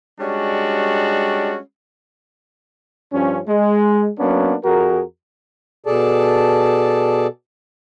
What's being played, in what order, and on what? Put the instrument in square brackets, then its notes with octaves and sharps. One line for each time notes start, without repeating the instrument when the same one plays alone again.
[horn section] G3 G#3 C#4 D4 F#4
[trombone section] G2 F3 C#4
G#3
F#3 A#3 B3 C#4 D4
F2 F#4 G#4 A#4
[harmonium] B2 G#4 A4 D5 A5